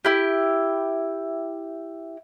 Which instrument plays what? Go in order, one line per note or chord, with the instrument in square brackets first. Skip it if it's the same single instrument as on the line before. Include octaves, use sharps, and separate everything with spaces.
[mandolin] E4 G4